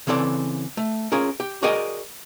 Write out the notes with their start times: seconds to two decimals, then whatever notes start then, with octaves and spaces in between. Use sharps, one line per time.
0.07 C#3 E3 C4 A4 D5
0.77 A3
1.12 C#4 F4 G#4 A#4
1.40 G4
1.63 F#4 G#4 A#4 D5 D#5 G5